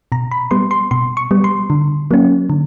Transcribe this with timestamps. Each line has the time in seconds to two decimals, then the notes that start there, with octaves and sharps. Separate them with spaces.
0.12 B2 A#5
0.31 B5
0.51 G3 B3 C6
0.71 C6
0.91 B2 C6
1.17 C#6
1.31 G3 B3
1.44 C6
1.70 D3
2.11 F#3 A#3 C#4
2.50 D3